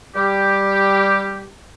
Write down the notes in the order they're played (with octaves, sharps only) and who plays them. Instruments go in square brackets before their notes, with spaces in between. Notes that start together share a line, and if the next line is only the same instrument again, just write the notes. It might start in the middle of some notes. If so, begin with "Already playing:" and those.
[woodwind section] G3 G4